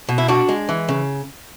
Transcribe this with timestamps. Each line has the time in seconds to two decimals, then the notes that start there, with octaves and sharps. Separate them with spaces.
0.09 B2
0.18 E4
0.28 D4 F#4
0.49 G#3
0.69 E3
0.89 C#3